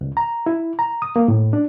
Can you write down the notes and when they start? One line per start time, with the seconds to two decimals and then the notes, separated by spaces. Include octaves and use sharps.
0.01 C#2
0.17 A#5
0.46 E4
0.79 A#5
1.02 D#6
1.16 A#3
1.28 A2
1.53 D4